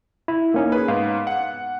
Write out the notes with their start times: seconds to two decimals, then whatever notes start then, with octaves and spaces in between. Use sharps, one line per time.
0.28 E4
0.54 A#3 C#4 D#4
0.72 G#4 B4
0.88 G#2 B3 F5
1.27 F#5